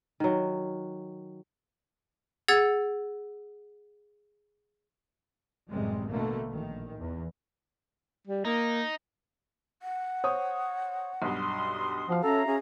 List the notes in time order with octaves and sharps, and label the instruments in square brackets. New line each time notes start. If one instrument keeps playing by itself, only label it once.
[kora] D#3 F#3
[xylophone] G#4 F#5 E6 G#6 A6
[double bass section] A1 F#2 C3 G3 G#3
B2 D3 A3 A#3
A#1 D#3
E2
[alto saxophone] G3
[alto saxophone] A#3 [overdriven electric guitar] D#4
[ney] F#5
[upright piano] C5 C#5 D#6
[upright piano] B1 G2 [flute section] C6 D#6
[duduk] F3 [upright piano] F#4 F5
[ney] C#4 [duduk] A4 [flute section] E5 A#5
[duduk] C#4 [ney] G#4